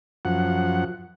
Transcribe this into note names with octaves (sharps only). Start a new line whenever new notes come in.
F#2 F3 F#5